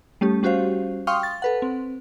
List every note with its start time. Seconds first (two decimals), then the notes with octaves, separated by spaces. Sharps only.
0.21 G3 A3 C#4 G4
0.43 G3 C#4 F#4 G4 C5 F5
1.07 F5 G5 C6 C#6 D#6 F6
1.23 A6
1.42 A4 B4 F#5
1.62 C4